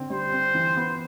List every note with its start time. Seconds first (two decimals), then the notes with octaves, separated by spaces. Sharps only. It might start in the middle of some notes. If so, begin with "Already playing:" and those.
Already playing: D3 C4
0.10 G3 C5
0.32 C4
0.55 E3
0.77 B3